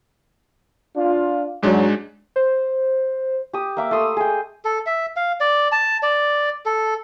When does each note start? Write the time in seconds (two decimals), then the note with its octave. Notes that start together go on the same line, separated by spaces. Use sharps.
0.95 D4 F4
1.63 G#2 F#3 G#3 D4
2.36 C5
3.53 G4 D#6
3.77 A#3 E5 D6
3.91 A3 C6 D#6 E6
4.17 G#4 G5
4.65 A4
4.86 E5
5.16 F5
5.40 D5
5.72 A5
6.03 D5
6.65 A4